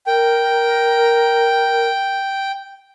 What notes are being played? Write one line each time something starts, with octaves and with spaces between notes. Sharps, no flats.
A#4 G5